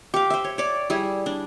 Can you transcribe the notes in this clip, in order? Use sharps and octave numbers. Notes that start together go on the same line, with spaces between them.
G4 F5
C5 E5
C#5
C#5 D5
G3 E4 G#4
D4